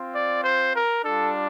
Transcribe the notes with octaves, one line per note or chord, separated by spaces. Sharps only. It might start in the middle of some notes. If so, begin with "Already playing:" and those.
Already playing: C4 F4
D5
C5
A#4
G3 D4 F4 A4